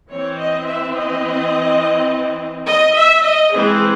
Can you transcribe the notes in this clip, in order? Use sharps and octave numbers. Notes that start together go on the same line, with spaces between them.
E3 C4 C#5
D#5
E5
D#5
D#5
E5
D#5
E3 G#3 C4 G#4